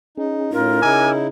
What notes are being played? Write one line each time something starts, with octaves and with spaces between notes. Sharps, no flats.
C#4 D#4 G#4
A2 C#4 D#4 F4 A#4
C#3 D#4 E4 G#5 D6 E6